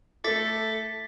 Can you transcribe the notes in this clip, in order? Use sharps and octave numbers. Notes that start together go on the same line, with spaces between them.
A3 E4 A4 D6 A6 B6